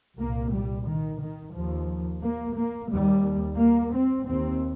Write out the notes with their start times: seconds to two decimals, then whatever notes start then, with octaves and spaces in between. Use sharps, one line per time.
0.19 C2 A#2 A#3
0.53 G3
0.87 D#3
1.21 D#3
1.55 D#2 F3
2.23 A#3
2.56 A#3
2.90 D#2 G3
3.58 A#3
3.93 C4
4.27 D#2 C4